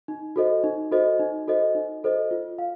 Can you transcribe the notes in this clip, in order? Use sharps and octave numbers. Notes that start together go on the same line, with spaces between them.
D#4
F#4 A4 C5 D#5
D#4
F#4 A4 C5 D#5
D#4
F#4 A4 C5 D#5
D#4
F#4 A4 C5 D#5
F4
F5